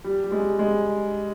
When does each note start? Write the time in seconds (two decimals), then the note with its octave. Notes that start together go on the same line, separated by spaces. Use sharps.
0.04 G3
0.24 G3
0.32 G#3
0.59 G#3